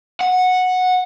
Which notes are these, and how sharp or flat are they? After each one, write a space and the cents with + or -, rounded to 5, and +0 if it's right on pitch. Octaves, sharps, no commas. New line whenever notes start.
F#5 -10